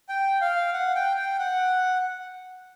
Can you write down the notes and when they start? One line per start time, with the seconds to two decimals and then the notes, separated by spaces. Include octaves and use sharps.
0.09 G5
0.41 F5
0.73 F#5
0.95 G5
1.17 G5
1.39 F#5